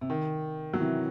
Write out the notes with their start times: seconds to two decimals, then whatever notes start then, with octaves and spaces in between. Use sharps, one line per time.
0.01 C3
0.10 D#3
0.73 F#3
0.80 C3 E3